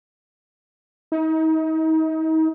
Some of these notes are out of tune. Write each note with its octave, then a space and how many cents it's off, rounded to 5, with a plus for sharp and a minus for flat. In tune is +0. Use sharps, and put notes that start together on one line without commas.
D#4 +35